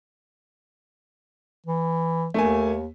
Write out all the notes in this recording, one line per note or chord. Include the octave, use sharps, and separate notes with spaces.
E3
D#2 A3 A#3 G#5